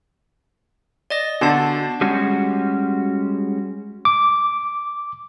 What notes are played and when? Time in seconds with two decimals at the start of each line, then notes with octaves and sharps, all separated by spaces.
1.10 D5 D#5 A#6
1.41 D3 B3 F#4 A5
2.01 G3 G#3 C#4 F#4
4.05 D6